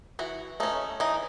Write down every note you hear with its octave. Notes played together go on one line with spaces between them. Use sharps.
E3 F#4
A3 C#4 D#4
E3 D#4